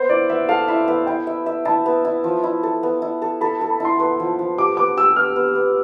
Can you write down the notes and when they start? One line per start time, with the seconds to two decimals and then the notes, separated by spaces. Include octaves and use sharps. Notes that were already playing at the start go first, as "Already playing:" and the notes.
Already playing: B3 C5
0.09 E4 D5
0.29 B3 E5
0.49 A4 F5
0.68 E4 E5
0.88 B3 E5
1.07 E4 G5
1.27 E5
1.46 E5
1.65 E4 A5
1.86 B3
2.05 E4
2.24 F3
2.43 E4
2.63 A4
2.83 B3
3.02 E4
3.22 A4
3.41 A4 B5
3.61 A4
3.70 B5
3.80 E4 C6
4.00 B3 C6
4.20 F3
4.39 F3
4.58 G4 D6
4.77 B3 D6
4.97 G4 E6
5.16 B3 F6
5.36 B3
5.55 B3